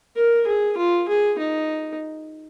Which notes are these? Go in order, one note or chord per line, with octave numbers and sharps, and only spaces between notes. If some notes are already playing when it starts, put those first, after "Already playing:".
A#4
G#4
F4
G#4
D#4